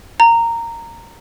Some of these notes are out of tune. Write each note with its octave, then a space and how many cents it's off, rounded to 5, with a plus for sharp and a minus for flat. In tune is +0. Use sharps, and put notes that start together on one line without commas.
A#5 -15